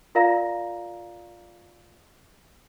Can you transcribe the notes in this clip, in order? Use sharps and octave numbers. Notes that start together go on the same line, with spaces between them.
F4 A#4 D5 F5 A#5 A#6